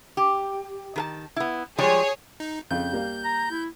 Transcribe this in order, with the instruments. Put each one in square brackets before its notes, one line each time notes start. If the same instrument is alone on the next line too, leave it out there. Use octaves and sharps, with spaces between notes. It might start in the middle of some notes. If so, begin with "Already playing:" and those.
[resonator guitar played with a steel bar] G4
D#3 A#4 A5
B3 E4
[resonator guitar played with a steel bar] F3 G3 G#3 [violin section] G#4 C#5
[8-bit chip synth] D#4
[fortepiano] F2 C#3 [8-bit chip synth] G6
[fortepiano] G3 A#3 F5
[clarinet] A#5
E4